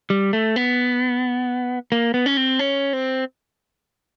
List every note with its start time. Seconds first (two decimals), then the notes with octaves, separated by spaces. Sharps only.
0.10 G3
0.33 A3
0.56 B3
1.92 A#3
2.14 B3
2.26 C#4
2.37 C4
2.59 C#4
2.93 C4